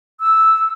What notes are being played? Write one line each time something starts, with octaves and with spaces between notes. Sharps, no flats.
E6